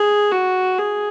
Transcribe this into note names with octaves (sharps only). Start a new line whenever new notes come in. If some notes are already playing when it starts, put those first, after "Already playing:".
Already playing: G#4
F#4
G#4